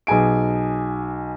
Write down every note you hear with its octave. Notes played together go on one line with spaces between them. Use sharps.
B1 G#4 G#5 D7